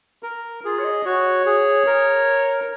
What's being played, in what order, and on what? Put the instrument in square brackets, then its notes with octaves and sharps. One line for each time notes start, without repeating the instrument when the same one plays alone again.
[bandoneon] A#4
[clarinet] F4 [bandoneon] G#4
[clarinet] C#5
D#5
[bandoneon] F#4 [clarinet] C#5
[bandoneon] G#4
A#4